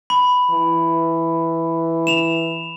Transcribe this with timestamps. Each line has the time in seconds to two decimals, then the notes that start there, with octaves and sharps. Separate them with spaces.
0.10 B5
0.51 E3
2.07 E7 F7